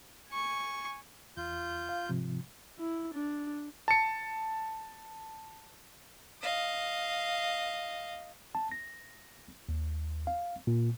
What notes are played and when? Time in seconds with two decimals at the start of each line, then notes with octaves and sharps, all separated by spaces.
0.31 G#5 C#6
1.37 E2 F4 G6
1.89 F5
2.09 G#2 C3 F3
2.79 E4
3.14 D4
3.88 A5 C#7
6.41 D#5 F5
8.55 A5
8.72 A#6
9.69 D#2
10.27 F5
10.67 A#2